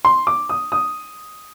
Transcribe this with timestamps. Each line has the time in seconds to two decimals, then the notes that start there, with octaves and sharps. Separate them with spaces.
0.05 C6
0.27 D6
0.49 D#6
0.72 D#6